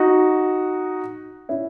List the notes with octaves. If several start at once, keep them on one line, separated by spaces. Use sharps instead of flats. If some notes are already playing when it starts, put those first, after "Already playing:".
Already playing: D#4 F#4
C#4 E4